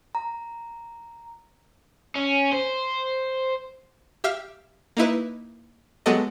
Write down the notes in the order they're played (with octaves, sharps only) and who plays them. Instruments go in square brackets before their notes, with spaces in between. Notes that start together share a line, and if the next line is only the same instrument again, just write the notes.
[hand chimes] A#5
[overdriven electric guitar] C#4
C5
[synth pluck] G4 E5 F5 F6
A#3 D#4 E4 B4
F#3 G#3 B3 G4 A4 D#5